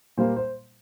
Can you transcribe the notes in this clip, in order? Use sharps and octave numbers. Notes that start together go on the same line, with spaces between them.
A#2 G3 A#3 C5
C5